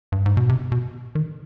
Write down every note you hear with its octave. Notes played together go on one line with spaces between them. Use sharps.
G2
G#2
B2
C3
B2
D#3